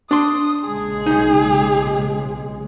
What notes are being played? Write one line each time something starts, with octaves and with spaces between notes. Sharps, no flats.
D4 C6 D#6
A#1 C#3 G#3 G#4
B1 D#4